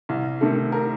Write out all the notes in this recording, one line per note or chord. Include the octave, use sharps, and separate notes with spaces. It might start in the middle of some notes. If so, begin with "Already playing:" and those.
C2
C3 D#3 A3
A#4